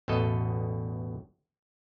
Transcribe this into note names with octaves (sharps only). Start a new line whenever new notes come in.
A1 E2 B2 A4 D#5